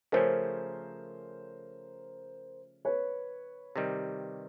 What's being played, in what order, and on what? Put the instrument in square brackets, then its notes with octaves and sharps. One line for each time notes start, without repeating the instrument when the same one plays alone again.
[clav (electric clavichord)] C#3 F3 A3 C#4 [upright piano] A#4 C5
[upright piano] B4 C#5
[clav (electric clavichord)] C3 D#3 G3